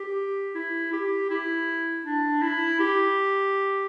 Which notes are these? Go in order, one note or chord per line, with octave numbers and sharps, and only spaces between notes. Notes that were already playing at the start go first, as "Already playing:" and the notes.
Already playing: G4
E4
G4
E4
D4
E4
G4